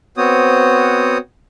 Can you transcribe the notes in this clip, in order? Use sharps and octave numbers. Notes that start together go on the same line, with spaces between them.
B3 C4 F#4 C5 C#5 D#6